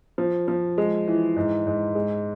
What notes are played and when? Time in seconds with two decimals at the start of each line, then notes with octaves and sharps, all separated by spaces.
0.18 F3
0.48 F3
0.78 G#3
1.08 E3
1.36 G#2
1.67 G#2
1.95 G#3